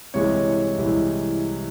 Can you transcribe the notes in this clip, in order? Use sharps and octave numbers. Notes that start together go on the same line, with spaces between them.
C2 C3 E3 G#3 C#5
C2 C3 E3 G#3